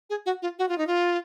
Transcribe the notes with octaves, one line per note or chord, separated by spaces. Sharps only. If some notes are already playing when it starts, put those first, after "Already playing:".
G#4
F#4
F4
F#4
F4
D#4
F4